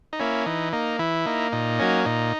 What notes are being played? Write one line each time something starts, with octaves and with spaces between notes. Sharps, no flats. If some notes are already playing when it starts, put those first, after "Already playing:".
D#4
A#3 C#4 E4
E3 D#4
A#3 D#4
E3 E4
A#3 D#4
A#2 D#4
F#3 A#3 C#4
A#2 D#4